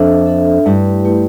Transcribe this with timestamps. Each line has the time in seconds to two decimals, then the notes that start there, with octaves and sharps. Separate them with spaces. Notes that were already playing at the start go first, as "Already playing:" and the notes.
Already playing: F2 D4 A4 E5
0.26 D4 A4 E5
0.65 G2 A3 E4 G4 B4
1.04 A3 E4 G4 B4